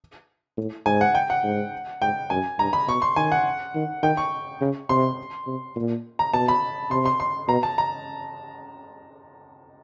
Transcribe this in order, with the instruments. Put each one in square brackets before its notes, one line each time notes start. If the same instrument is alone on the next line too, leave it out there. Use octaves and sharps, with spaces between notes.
[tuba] A2
[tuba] G#2 [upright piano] G#5
[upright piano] F#5
G5
F#5
[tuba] G#2
[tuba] G#2 [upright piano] G5
[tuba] F#2 [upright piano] G#5
[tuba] G2 [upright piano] A#5
[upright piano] B5
[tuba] B2 [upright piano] C#6
[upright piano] C6
[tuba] D#3 [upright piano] G#5
[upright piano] F#5
[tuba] D#3
[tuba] D#3 [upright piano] G5
[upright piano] C#6
[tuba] C#3
[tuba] C3 [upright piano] C6
[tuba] C3
A#2
[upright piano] A#5
[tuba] B2 [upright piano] A5
[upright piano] B5
[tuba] C3 [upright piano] C6
[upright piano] C6
C6
[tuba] B2 [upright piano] A#5
[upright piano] A5
A#5